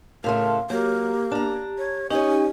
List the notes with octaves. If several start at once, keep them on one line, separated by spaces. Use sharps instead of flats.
A2 C#3 A3 A#4 F5 C6
F#3 A#3 G4
D4 A#5
C#5
C#4 D#4 G4 C#5 D#5 G#5